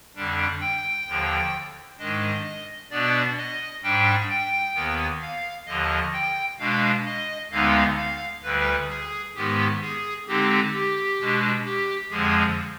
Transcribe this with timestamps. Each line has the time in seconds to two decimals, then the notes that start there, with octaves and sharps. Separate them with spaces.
0.15 F2 D3 G3 D4
0.60 G5
1.07 D#2 D3 F3
1.98 G#2 D#3 G#3 D4 D#5
2.91 B2 B3 D4 D5
3.37 D#5
3.83 G#2 G3 D4 G5
4.30 G5
4.75 D#2 D#3 B3
5.22 F5
5.67 D#2 D3 F3 D#5
6.13 G5
6.59 B2 G#3 D4 F5
7.06 D#5
7.51 D2 D3 G#3 B3 D#4 F5
7.97 F5
8.43 D2 D3 G3 B4
8.90 G#4
9.35 G#2 D#3 G#3 B3 G4
9.82 G#4
10.28 D3 G#3 C4 D#4 G4
10.73 G4
11.20 B2 G#3 D4
11.65 G4
12.11 F2 D3 F3 G#3 G#4